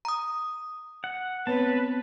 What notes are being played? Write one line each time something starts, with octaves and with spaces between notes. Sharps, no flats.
A#5 D#6
F#5
B3 C4 B4 C#5 A5